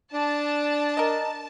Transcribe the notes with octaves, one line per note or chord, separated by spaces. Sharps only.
D4 A5
A#4 D#5